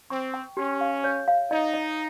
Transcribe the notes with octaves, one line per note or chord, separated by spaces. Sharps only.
C4 C#6
G5
C#4 G4
F5
C#5
F5
D#4 D#5
D#5